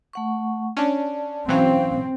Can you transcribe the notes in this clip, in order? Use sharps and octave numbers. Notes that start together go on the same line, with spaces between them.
A3 F#5 C#6
C#4 D4 D5 A5
E3 F#3 C4 C#4 F5